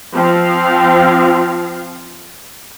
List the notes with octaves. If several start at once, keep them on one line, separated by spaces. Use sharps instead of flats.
F3 C4 F5